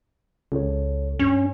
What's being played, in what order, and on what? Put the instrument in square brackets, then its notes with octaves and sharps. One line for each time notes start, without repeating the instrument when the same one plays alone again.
[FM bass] C#2 [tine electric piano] A4 C#5
[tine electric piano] G2 [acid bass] C#4